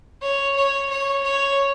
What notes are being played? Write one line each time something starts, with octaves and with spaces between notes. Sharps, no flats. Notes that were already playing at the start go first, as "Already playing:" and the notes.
C#5
C#5
C#5
C#5